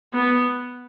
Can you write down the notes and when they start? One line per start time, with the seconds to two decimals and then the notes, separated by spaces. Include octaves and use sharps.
0.14 B3